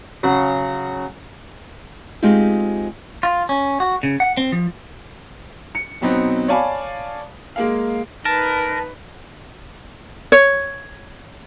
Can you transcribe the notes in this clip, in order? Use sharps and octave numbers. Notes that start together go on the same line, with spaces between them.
C#3 F#3 F#4
G#3 C4 D#4 F4 G4
F4
C#4
F#4
C#3
F#5
C4
F3
C#7
B2 F#3 B3 C4 D#4
C#5 D5 F5 G#5 A5 B5
G#3 A#3 F5
D#4 A#4 B4 A5
C#5